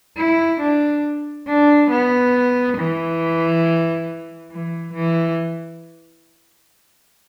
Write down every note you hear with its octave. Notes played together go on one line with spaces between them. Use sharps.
E4
D4
D4
B3
E3
E3
E3